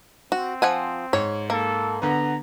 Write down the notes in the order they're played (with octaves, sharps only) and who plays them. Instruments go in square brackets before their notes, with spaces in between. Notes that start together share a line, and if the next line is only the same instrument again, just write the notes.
[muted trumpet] C4 [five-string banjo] F#4
[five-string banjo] F3 F#5 G#5
[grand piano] G#2 [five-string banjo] C#5
[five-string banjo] A#3 [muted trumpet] A4
[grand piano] D3 B3 [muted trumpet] A#5